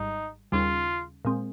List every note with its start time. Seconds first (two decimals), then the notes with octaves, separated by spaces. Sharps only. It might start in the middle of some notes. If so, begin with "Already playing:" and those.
Already playing: G#1 G#2 G3 D#4
0.52 D#2 C#3 G3 C#4 F4 G#4
1.25 A#2 G#3 C4